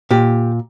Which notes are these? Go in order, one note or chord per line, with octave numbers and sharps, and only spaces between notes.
A#2 G4